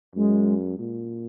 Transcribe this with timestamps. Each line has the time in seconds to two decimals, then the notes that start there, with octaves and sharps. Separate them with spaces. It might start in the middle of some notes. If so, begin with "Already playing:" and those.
0.15 F#2 G#3
0.79 A#2